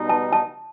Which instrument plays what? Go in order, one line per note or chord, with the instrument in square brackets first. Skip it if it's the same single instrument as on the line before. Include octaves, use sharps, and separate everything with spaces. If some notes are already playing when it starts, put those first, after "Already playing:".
Already playing: [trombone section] B2 G3 B3 D#4
[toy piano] A5
A5